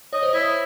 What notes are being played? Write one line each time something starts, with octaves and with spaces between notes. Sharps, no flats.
C#5 D#5
C5
E4 C#5